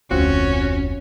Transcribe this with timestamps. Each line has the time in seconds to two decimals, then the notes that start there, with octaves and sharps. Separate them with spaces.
0.11 F1 D2 C4 C#4 F4 F#4